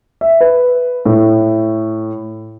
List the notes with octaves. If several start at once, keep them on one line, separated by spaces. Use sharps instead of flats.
E5
B4
A2